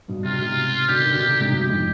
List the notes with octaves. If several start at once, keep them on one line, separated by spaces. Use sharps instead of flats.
G2 B2
C3 F4
B2
G#2 C3
B2 D3 G4
C3 D#3
B2 D3
C3
D3
G#2 C3
G2 B2 G4
F2 G#2